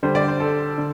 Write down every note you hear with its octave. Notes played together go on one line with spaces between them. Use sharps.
D3 G3 D4 C5
D5
C5
A4
D3